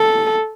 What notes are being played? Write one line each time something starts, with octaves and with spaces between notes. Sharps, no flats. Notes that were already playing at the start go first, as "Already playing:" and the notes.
Already playing: A4